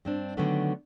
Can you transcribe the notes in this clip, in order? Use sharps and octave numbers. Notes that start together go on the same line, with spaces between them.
G2 C4 D4
D3 D#3 F#3 A3 B3 D4